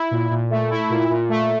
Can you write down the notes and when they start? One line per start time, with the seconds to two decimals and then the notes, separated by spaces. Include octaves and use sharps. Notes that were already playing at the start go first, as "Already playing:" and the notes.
Already playing: E4
0.11 A#2
0.31 A#2
0.50 A3
0.70 E4
0.90 A#2
1.10 A#2
1.29 A3